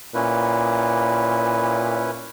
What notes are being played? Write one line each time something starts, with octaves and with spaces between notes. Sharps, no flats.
A#2 C#4 E4 B4